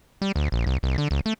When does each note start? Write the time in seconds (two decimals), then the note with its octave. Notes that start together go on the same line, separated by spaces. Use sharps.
0.22 G3
0.36 D2
0.52 A#1
0.67 C2
0.83 C2
0.98 D3
1.11 C#2
1.26 A3